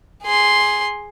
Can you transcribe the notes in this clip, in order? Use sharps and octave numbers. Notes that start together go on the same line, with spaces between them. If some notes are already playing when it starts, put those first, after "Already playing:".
G#4 C6